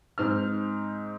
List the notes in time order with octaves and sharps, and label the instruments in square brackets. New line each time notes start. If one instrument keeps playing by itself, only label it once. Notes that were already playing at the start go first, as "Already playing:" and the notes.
[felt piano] G#2 C4 D#4 F6